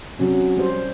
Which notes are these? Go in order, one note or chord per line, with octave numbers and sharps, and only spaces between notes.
C3 F#3 C#4
G3 C5